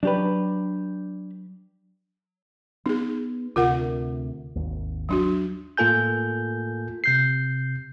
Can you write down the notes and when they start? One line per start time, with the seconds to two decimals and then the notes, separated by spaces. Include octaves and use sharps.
0.03 F#3 D4 G4 B4
2.86 B3 D#4 G#4
3.56 D2 C3 F4 A#4 F#5
4.55 G#1 D#2
5.09 F#3 D4 F#4
5.77 A2 A#3 F4 A4 G#5 G6
7.04 C3 G6 C7